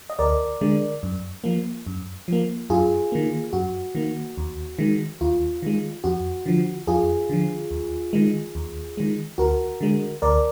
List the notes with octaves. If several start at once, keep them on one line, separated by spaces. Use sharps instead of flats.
D#5
D2 A#4 D5
D3 G#3
F#2
F3 A#3
F#2
F3 A#3
F#2 F4 G#4
D#3 A#3
F#2 F#4
D#3 A#3
D#2
D#3 G#3
D#2 F4
D#3 G#3
F2 F#4
D3 F3
F2 F4 G#4
D3 F3
D#2
D#3 G#3
D#2
D#3 G#3
D2 F#4 A#4
D3 G#3
D2 A#4 D5